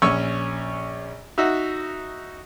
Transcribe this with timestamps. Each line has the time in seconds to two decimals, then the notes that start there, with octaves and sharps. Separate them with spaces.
0.02 A#1 C#4 C#5 C#6 E6
1.38 D#4 F#4 E5